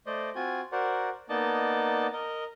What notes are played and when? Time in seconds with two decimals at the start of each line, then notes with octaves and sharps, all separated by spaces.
0.06 A3 C5 D5 D#5
0.35 C4 F4 F#4 G#5
0.72 F#4 A#4 C5 D5 F#5
1.29 A#3 B3 D#4 D5 D#5 A5
2.13 A#4 D#5